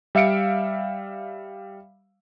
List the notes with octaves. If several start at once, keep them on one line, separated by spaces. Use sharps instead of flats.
G3 E5 F5 C#7 D7